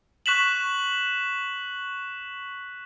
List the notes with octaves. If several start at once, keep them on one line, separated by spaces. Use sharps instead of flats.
C#6 F#6 B6 E7 F#7